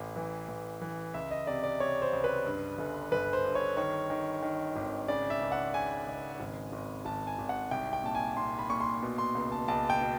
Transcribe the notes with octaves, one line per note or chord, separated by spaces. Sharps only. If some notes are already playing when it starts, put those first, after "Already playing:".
Already playing: A1
E3
A1
E3
C#2 E5
D#5
C3 D5
D5
C3 C#5
C5
C#2
B4
G2
G1
G1 B4
C5
G2
C#5
D#3 C#5
D#3
D#3
G#1
C#3 D5
E5
C#2
F#5
C#3 G#5
C#2
G#1
G#1
G#1 A5
G#5
G#1
F#5
C2 G5
G5
A#2 A5
G#5
A#2 C6
B5
A#2 C#6
C6
B2
C6
C#2
A5
C#2 A5
G5
B2